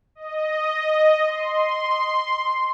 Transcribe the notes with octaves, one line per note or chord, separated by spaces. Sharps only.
D#5
C6